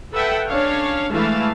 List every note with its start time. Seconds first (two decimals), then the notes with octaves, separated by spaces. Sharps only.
0.13 A4 B4 E5 F#5 G5
0.49 C#4 D4 C#5 F5
1.12 E3 G#3 A3 E4 F5 A5